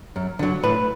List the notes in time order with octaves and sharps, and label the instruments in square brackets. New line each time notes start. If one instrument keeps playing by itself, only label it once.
[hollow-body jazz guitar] F#2
D3 F#3
A2 B4